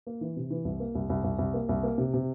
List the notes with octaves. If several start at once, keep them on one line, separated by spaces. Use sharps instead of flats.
A#3
E3
C3
E3
C2
A#3
C2
C2
C2
C2
A#3
C2
A#3
C3
C3